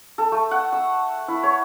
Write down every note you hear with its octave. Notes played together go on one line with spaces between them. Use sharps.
A4
A3
F#5
E6
E4
C#5